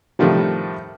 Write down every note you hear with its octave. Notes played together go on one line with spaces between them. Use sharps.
A2 C3 D#3 F3 G3